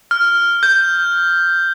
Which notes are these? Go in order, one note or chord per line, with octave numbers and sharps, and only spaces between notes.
F6
G6